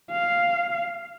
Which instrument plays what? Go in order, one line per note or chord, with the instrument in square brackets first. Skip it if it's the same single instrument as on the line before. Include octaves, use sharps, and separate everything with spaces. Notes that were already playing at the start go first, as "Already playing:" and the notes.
[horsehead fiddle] F5